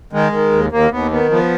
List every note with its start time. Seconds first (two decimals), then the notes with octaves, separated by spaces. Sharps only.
0.13 D#3 G#3
0.32 D#3
0.52 D#2
0.72 D#2 A#3
0.91 D#2 B3
1.11 D#3 B3
1.30 F3 B3